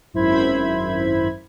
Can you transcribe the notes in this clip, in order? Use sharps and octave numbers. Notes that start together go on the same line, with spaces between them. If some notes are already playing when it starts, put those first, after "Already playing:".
G#1 F#2 E4 C5 B5 G#6